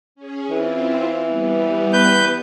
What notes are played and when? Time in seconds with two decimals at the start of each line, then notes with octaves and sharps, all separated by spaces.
0.15 C#4 G#4
0.50 E3 C4 E4 F4
1.24 G3 B3
1.93 B4 G6